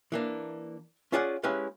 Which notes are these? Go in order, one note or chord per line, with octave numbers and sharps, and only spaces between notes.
E3 A#3 D4
C#4 F4 G#4 D5 F5 F#5
G#3 C#4 E4 G4 B4 F5